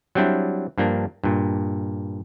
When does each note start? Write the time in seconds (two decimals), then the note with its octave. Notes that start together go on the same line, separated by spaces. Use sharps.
0.15 F#3 G3 C4 D4 E4
0.78 G2 F3 A#3 D4
1.24 G2 A#2